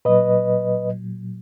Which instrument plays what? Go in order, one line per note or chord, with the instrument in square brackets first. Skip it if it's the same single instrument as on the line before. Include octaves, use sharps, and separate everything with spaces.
[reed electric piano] A#2 F#3 B4 D#5